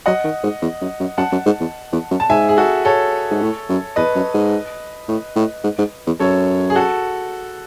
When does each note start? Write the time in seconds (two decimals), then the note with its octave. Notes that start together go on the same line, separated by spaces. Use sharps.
0.06 F#3 D#5 F#5
0.24 D#3
0.43 G#2
0.62 E2
0.81 F#2
0.99 F#2
1.18 F#2 F#5 A5
1.32 F#2
1.45 G#2
1.60 E2
1.92 E2
2.11 F#2
2.20 A5
2.29 G#2 E5 G#5
2.49 G#4
2.57 F#4 A4
2.85 A4 C#5
3.30 G#2
3.41 A2
3.69 F#2
3.96 E2 B4 D#5
4.15 F#2
4.34 G#2
5.08 A2
5.36 A2
5.63 G#2
5.78 G#2
6.06 E2
6.19 F#2 A4 C#5
6.70 G#4
6.75 F#4 A4